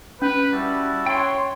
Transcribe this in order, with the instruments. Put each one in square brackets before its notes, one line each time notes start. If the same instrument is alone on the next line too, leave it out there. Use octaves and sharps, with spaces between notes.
[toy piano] C#4 [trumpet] B4
[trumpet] G3 [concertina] E4 F#4 A5
[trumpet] C#5 [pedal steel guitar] G5 C6